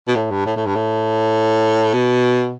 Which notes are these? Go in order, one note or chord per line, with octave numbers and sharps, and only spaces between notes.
B2
A2
G2
A2
A2
G2
A2
B2